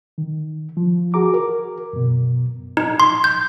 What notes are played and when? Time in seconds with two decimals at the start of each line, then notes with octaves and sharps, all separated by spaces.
0.18 D#3
0.77 F3
1.14 F#4 G#4 A#5 D6
1.34 A#4
1.93 F#2 B2
2.77 D#4
3.00 C6
3.24 G6